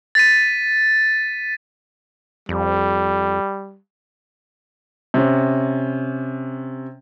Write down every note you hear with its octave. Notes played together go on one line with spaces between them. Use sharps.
A6 B6 D#7
F2 G3
C3 C#4